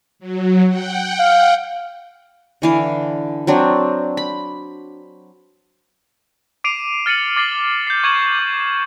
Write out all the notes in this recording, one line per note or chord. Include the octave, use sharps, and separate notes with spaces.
F#3
F#5 G5
F5
D3 E3 F5
F#3 C4 D4
B5
D6 C7 D7 D#7 F7
F6 A6 C#7 D#7 F#7
D6 A6 C7 G7
G6 C7
C#6 G#6 E7 F#7
D6